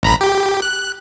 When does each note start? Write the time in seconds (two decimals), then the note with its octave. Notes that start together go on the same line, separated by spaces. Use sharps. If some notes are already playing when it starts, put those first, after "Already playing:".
0.03 A1 A#5 B5
0.21 G4
0.62 F#6